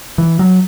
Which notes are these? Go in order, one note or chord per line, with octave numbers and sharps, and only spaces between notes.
E3
F#3